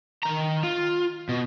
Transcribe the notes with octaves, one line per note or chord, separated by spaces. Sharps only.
D#3 A#5
F4
B2